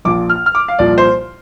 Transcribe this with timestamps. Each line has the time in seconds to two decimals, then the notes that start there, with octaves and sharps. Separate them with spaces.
0.05 A#1 A#2 F3 D6
0.29 F6
0.46 F6
0.55 D6
0.68 F5
0.79 C2 A#2 F3 D5
0.98 C5